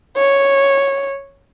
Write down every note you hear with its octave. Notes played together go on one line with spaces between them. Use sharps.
C#5